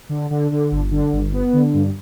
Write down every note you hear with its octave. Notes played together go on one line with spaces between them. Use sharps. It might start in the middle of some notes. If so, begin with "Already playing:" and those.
D3
D3
D3
G1
D3
G1
B3
D3
G2